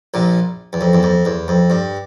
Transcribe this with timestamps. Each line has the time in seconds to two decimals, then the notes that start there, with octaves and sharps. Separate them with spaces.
0.14 A#1 A#2
0.73 E2
0.81 F2
0.93 E2
1.03 F2
1.25 E2
1.48 F2
1.70 G2